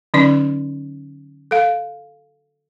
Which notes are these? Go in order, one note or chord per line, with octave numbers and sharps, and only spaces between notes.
D3 F#3 C#4 D#4 D5 C6
A4 F5